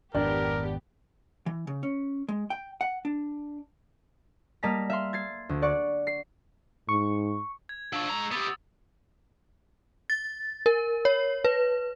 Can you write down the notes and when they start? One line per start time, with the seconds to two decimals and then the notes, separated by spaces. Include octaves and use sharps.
0.14 G#1 F2 B3 D4 G4 A#4
1.46 E3
1.67 C#3
1.83 C#4
2.28 G#3
2.50 G5
2.81 F#5
3.05 D4
4.63 G3 A#3 D#5 A5 A#5 B6
4.90 E5 F5 C6
5.13 G#6 A6 C7
5.49 D2
5.62 D5 F#5 C#6
6.07 C7
6.89 G#2 C#6
7.69 G#6
7.93 F3 D4 C#6 E6
8.09 G#3 A#5
8.32 B3 G4 D#6 A6
10.10 A6
10.66 A#4
11.05 C#5
11.45 B4